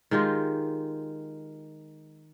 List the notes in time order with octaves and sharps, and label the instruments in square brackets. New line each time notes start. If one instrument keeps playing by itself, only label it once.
[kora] D#3 G#3 F4 G4